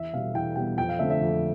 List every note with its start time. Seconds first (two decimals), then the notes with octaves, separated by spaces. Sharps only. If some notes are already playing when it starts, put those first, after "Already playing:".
Already playing: E2 E5
0.13 B2 G3 B3 F5
0.34 E2 G5
0.56 B2 G3 B3 G5
0.77 F2 G5
0.89 F5
0.99 D3 A3 C4 E5
1.10 E5
1.21 F2